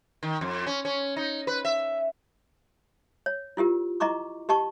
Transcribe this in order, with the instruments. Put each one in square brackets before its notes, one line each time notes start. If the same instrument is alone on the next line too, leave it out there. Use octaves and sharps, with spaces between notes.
[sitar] D#3
F2
C#4
C#4
D#4
B4
E5
[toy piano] C#5
E4 F4 G4 A#4
E4 D#5 A#5 C#6 D6
G4 D#5 A5 C#6